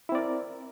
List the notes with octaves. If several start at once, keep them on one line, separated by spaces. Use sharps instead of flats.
C4 E4 A#4 D5